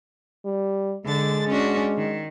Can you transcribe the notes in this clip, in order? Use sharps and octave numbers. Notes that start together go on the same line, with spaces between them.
G3
D3 G#3 A6
C#4 D4 F#4
D#3